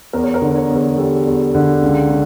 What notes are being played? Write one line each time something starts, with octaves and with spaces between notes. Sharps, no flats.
E2 A#4
C#5
A#4
D3
C#5
E2
A#4
G3 A4
E2
D3
C#2
C#3